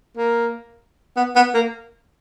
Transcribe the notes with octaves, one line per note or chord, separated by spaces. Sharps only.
A#3
B3
B3
A#3